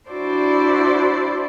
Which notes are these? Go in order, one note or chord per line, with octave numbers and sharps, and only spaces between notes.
D4 E4 F#4 C5 D5